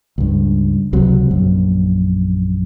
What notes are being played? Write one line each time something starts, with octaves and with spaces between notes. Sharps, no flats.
C#2 G2
C#2 C3 F#3
A#1 F#2